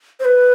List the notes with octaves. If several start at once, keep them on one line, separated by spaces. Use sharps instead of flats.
C5
B4